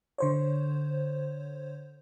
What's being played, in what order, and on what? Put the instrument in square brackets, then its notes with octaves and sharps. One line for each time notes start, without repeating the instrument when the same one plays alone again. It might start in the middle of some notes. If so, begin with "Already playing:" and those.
[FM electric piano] D3 C5 C#5